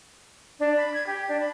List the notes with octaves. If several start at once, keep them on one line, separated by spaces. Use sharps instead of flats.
D4
B5
G#6
G4
D4
B5